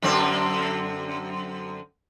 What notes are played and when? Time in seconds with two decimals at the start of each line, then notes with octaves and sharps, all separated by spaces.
0.02 F#2 D3 C4